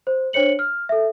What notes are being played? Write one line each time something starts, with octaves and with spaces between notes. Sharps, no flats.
C5
D4 C5 C#5 C#7 F#7
F6
A4 E5